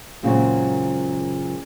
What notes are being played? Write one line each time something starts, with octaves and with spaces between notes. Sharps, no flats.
F#2 A#2 C#3 G#3 C4 F#4